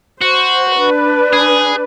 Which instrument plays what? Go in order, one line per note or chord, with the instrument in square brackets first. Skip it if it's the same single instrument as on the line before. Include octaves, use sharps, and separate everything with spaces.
[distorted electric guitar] F#4 [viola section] C5
[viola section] D4 B4
[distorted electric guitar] G#4